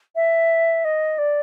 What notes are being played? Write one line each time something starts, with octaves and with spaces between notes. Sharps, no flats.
E5
D#5
D5